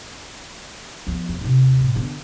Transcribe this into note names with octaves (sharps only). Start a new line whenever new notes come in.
F3 B3
E2
D#2 C3
A2
D3 B3